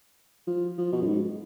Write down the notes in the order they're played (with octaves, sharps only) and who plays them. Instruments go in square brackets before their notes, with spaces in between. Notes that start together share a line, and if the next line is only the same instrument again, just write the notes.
[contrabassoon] F3
F3
B2
F#2
G#2